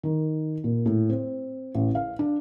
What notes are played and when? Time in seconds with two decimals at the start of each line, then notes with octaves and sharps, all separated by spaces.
0.03 D#3
0.64 A#2
0.86 A2
1.10 C4
1.75 A1
1.95 F5
2.19 D4